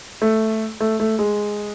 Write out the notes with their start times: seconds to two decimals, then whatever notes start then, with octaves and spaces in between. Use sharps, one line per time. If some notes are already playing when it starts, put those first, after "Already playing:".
0.22 A3
0.80 A3
1.00 A3
1.19 G#3